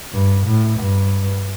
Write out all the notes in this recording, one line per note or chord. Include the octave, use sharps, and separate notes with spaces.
G2
A2
G2